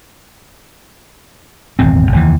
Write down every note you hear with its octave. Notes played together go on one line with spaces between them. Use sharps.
D#1 G#1 E2 C4
F1 D#2 E3